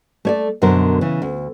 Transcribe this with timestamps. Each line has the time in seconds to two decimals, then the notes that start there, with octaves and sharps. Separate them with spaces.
0.25 A3 C#5 D5
0.62 F#2 B2 D3 A#4 C5
1.01 C#3 E3
1.22 D2